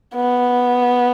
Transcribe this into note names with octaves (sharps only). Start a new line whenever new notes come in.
B3